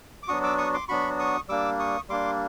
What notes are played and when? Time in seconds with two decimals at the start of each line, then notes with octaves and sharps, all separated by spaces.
0.23 D6
0.28 F#3 B3 D4 F#4 C#6 D#6
0.43 D6 E6
0.58 C#6 D#6
0.73 C6 D6
0.88 F#3 B3 D4 F#4 B5 C#6
1.19 C#6 D#6
1.48 G3 A#3 D4 D6 E6
1.79 C#6 D#6
2.09 G3 A#3 D4 C6 D6